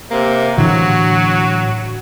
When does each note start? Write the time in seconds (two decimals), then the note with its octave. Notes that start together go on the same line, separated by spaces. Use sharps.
0.11 C3 A#3
0.58 A2 D3 E3 F#3 F#4